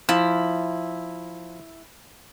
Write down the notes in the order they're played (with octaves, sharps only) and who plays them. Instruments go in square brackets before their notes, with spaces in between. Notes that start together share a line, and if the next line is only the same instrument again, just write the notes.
[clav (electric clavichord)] F3 [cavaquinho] E4